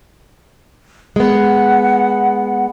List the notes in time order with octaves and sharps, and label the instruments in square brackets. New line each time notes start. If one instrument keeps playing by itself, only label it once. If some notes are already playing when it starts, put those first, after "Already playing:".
[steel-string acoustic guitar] G#3 B3 [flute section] F#5